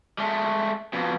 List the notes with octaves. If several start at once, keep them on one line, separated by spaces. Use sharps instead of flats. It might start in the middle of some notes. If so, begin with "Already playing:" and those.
G#3 A3
F2 B2